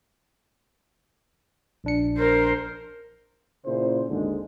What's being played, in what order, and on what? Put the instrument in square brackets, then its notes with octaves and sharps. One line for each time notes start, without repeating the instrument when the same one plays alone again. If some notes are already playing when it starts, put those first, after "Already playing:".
[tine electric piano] A#1 D4 C#7
[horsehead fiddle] A#4 C5
[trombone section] A#2 C#3 E4 C5
G#1 D#2 G#2 D3 G#3